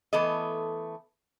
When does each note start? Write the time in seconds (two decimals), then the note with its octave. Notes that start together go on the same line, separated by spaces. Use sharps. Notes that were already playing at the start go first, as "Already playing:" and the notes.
0.13 E3 A3 B3 A4 D#5